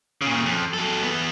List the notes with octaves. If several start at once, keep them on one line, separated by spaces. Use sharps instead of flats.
A#2 C#3
F2
F#3 A4
E3 B3